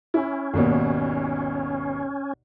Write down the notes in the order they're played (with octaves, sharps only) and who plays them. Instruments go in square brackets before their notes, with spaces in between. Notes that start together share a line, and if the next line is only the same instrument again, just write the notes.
[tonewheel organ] C#4 [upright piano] E4
[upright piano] G#1 D#2 B2